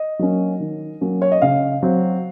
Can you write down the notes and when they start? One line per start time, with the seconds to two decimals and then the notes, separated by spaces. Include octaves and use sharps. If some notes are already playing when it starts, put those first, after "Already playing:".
Already playing: D#5
0.19 F#3 A#3 C#4
0.60 D#3
1.01 F#3 A#3 C#4
1.22 C#5
1.32 D#5
1.42 C#3 F5
1.83 F#3 C4